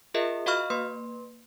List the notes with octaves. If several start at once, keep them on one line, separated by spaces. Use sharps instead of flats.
F4 G#4 A#4 D#5 E5
F#4 D#5 F5 B5 C#6 F6
A#3 B4 C6